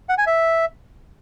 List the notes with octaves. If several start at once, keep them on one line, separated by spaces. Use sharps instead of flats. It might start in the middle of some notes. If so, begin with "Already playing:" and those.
F#5
G#5
E5